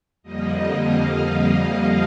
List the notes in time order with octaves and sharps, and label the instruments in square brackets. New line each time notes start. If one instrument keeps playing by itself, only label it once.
[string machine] F2 D3 G3 A#3 D#5
F5